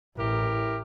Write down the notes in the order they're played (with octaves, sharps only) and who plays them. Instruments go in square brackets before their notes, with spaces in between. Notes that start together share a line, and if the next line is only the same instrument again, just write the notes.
[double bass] A1 [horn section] E4 G4 A#4